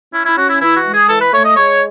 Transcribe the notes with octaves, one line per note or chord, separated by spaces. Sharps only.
C#4 E4
E4
C#4 F#4
E4
E3 E4
F#4
G#3
G#4
E3 A4
B4
A3 C#5
D#5
G#3 C#5